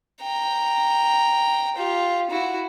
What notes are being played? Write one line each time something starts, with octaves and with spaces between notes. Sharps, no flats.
G5 A#5
F4 G4
E4 F#4